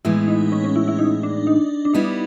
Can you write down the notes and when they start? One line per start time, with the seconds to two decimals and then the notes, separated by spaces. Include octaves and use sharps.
0.05 A2 E3 G#3 B3 E4
0.28 D#4
0.52 C#4
0.64 C#4
0.76 E4
0.88 E4
0.99 D#4
1.23 D4
1.47 D#4
1.85 D4
1.94 G3 B3 D#4 E4